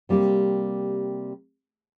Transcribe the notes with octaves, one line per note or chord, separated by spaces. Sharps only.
C3 G3 A#3 G4